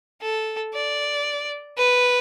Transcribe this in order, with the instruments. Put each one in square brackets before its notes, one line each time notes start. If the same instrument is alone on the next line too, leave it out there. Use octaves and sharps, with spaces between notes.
[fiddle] A4
D5
B4